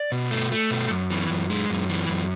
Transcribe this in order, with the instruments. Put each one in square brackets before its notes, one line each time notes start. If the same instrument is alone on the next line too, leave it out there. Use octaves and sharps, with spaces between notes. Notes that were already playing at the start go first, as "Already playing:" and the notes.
Already playing: [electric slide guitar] D5
B2
A3
A3
B2
F#2
E3
F#2
G#3
F#2
E3
F#2